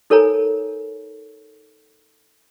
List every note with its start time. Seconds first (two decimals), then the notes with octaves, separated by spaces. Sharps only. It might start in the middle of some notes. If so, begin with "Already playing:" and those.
0.10 D#4 A4 A#4 C#5 G#5 A#5